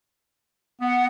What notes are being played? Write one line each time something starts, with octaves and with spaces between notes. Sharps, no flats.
B3 F#5